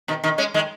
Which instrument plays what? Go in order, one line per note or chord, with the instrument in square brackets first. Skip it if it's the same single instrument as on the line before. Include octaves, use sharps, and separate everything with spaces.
[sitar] B2 D#3
B2 D#3
G#3 C#4
D#3 G#3